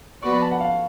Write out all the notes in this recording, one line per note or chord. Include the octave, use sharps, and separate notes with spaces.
F3 B3 F#4 B4 D5 C#6
B5
A5
F#5
F5